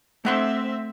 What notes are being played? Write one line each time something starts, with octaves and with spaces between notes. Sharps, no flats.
A3 C4 E5 F#5 C6